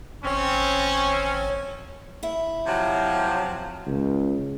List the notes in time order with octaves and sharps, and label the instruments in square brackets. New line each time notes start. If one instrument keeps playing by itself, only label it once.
[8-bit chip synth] G#1 C#5 [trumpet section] C4 C#4
[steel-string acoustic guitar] E4 E5
[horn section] C3 F3 F#3
[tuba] C#2